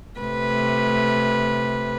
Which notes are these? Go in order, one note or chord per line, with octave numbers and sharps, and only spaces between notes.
C3 A3 B4